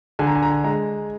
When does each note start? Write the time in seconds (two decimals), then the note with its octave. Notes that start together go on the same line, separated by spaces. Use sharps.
0.19 D3 G#5
0.27 A#5
0.35 G#5
0.43 A#5
0.51 G#5
0.64 G#3 A#5